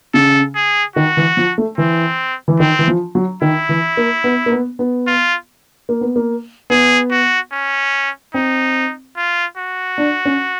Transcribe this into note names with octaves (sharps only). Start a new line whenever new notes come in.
C#3 A4
G#4
D#3 F#4
E3
F3
A3
E3 C4
E3
D#3 C4
E3
F3
F#3
D#3 E4
E3
A#3
B3
A#3
B3
B3
F4
A#3
B3
A#3
B3 G#4
F#4
C#4
C4 D#4
F4
F#4
D4
C#4